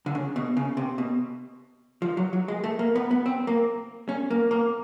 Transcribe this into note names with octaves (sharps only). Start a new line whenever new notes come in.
D3
C#3
B2
C#3
C3
B2
F3
F#3
F#3
G#3
A3
A#3
B3
B3
C4
A#3
C#4
A#3
A#3